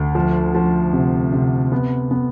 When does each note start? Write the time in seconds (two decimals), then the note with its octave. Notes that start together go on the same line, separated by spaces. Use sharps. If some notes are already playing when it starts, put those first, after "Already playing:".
Already playing: D2
0.15 F3
0.55 F3
0.93 C3
1.32 C3
1.72 B3
2.11 B3